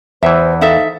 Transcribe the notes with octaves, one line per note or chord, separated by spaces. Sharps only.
E2 E3 C5 E5
D#4 A4 E5 F5